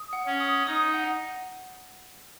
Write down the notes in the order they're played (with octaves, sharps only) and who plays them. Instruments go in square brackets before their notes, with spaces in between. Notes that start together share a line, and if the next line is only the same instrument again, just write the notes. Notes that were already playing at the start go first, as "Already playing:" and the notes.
Already playing: [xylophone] D#6
F#5
[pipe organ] C#4
[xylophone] D#6
[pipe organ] D#4 [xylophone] D#6
[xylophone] F#5